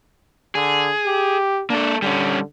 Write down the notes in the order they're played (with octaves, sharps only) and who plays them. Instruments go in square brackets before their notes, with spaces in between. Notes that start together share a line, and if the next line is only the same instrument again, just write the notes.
[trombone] D3 [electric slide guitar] G#4
[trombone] G4
[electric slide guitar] A#3 A4 [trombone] D4
[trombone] D3 [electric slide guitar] G3 C#4